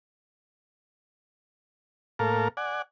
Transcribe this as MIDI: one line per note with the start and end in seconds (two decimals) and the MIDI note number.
2.19 2.48 45
2.19 2.48 58
2.19 2.48 69
2.19 2.48 70
2.19 2.48 77
2.57 2.82 74
2.57 2.82 78
2.57 2.82 80